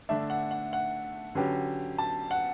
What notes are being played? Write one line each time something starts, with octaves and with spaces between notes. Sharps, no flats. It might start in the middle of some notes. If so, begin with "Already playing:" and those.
D3 A3 D4 E5
F#5
F#5
F#5
D3 F#3 C#4 G4 B4
A5
F#5